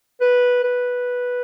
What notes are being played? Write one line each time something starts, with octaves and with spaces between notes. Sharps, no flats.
B4
B4